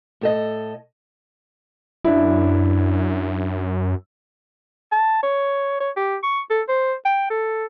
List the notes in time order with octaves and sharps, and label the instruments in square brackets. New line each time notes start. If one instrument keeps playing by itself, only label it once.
[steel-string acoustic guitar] A2 A4 D#5
[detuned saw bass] F#2 [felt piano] D4 E4
[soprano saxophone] A5
C#5
C#5
G4
C#6
A4
C5
G5
A4